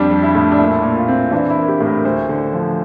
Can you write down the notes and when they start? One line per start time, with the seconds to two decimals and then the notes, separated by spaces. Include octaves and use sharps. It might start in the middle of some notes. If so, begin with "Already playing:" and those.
Already playing: F2 G3 D4
0.11 G3
0.23 E4
0.35 A2
0.52 D4
0.58 A#2 E4
0.83 A#2
0.96 F4
1.08 C4
1.31 E3 D4
1.50 E4
1.56 A#3
1.68 G4
1.80 A2
1.86 A#4
2.05 D2 C5
2.29 D3
2.53 F3